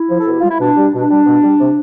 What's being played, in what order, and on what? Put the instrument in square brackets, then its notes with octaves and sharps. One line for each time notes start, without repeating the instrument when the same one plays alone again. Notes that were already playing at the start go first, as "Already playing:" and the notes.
Already playing: [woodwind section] E4
F3
A4
B2 G4
G3 F4
E4
B2 D4
G3
B2 D4
G3
B2
G3
C3